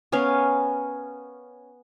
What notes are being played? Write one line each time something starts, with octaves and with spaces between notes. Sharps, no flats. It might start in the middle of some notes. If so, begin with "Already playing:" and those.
B3 C#4 A#4 F5